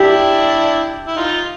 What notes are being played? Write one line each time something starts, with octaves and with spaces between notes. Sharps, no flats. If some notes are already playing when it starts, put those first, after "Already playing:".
Already playing: D4 E4 G4
E4
D#4 F4